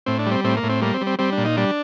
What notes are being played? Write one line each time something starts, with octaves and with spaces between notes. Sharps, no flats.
A2 C4
D4
G3
C4
A2 C4
A#3
A2
C4
G3 A#3
C4
G3
C4
G3 C4
D4
A#2
D#4
G3 D4